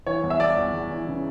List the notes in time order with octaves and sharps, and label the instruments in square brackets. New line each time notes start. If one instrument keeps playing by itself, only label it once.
[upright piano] E3 C#5
E2
E5
E2 D5
E2
E2
E3
C#3